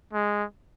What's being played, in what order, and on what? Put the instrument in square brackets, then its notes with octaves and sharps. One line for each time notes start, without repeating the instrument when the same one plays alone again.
[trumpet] G#3